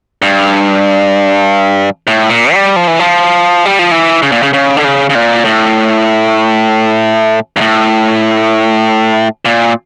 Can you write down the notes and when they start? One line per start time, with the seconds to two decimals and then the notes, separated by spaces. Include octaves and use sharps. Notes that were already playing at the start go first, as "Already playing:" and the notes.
0.22 G2
2.07 A2
2.30 A#2
2.53 G3
2.76 F3
2.87 E3
2.99 F3
3.65 G3
3.79 F3
3.91 E3
4.22 C#3
4.32 A#2
4.43 C#3
4.53 C#3
4.77 D3
4.84 C#3
5.10 C#3
5.15 A#2
5.45 A2
7.57 G2
7.61 A2
9.45 A#2